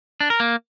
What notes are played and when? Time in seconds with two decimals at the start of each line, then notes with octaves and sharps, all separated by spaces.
0.21 D4
0.30 A#4
0.40 A#3